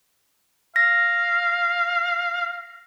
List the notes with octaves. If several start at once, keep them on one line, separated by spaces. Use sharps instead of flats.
F5 A#6